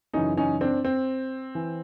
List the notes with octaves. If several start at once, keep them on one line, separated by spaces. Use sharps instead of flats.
F#2 C#3 E3 C#4 D#4
C#4 D#4
C4 D4
C4
E3